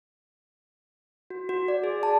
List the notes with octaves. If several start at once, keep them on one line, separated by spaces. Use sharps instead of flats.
F#4
F#4
D5
G#4
A5